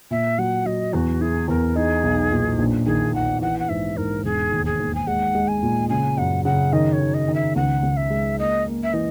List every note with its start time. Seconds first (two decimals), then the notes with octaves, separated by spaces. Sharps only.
0.11 A#2 E5
0.38 F#3 F#5
0.65 F#3 D#5
0.93 E2 F#4
1.21 E4 G#4
1.48 E2 A#4
1.76 D#4 G#4
2.03 B1
2.31 A#2
2.58 A#1
2.86 D#3 G#4
3.14 D#3 F#5
3.42 E3 F#5
3.60 F#5
3.69 G#2 E5
3.97 G#2 A#4
4.24 E1 G#4
4.52 D#2
4.66 G#4
4.80 D#2
4.95 G#5
5.07 G#3 F#5
5.35 G#3
5.48 G#5
5.63 A#2
5.89 C#3 G#5
6.17 F#2 F#5
6.45 C#3 F#5
6.73 D#3 D#5
6.93 C#5
7.00 D#3
7.14 D#5
7.28 D#3
7.34 E5
7.56 C#2 F#5
7.83 C#2
7.97 E5
8.10 G#3
8.39 A#3 D#5
8.66 A#3
8.83 E5
8.93 E3 D#5